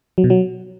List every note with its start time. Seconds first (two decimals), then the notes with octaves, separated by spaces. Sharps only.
0.18 F#3
0.24 B2
0.30 F#3